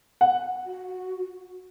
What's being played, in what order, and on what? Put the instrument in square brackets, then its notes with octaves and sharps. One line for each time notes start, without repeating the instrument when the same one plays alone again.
[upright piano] F#5
[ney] F#4